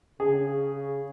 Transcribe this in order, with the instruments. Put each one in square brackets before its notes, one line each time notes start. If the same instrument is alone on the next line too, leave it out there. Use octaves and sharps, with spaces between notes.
[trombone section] C#3 [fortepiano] G#4